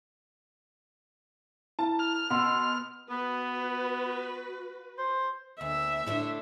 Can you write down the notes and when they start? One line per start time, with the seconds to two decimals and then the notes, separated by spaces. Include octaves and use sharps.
1.79 E4 A5
1.99 F6
2.30 B2 F#5 C6 E6
3.10 B3 F#4 B4
4.98 C5
5.61 D2 E5
6.07 A2 D3 D4